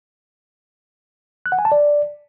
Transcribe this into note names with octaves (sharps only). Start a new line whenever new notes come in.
F#6
F#5
G#5
A5
D5